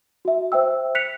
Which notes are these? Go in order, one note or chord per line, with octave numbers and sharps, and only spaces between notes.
F#4 E5
C5 E5 G5 E6
F#6 B6 C#7 F7